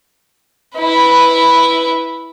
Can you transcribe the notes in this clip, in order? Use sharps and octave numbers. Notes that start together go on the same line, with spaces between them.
E4 B4